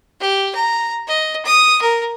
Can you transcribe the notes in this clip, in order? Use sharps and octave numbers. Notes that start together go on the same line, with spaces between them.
G4
A#5
D#5
D#6
A#4